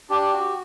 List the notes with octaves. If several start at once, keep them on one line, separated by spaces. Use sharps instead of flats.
D4 G4
F#4